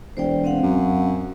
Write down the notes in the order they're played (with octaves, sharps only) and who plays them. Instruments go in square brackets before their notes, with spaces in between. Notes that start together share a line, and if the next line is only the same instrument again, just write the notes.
[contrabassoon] E1 [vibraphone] C5 D5 G5
[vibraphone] C4 F5 F#5
[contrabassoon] F#2